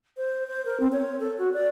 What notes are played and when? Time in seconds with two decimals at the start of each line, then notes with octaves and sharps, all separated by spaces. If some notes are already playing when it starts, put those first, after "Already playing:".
0.17 C5
0.48 C5
0.65 A#4
0.80 C4
0.92 C#5
1.20 A4
1.38 F#4
1.54 D5